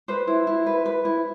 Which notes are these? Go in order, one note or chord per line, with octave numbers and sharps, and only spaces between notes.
B4 C5
E4
E4
B4
B4
E4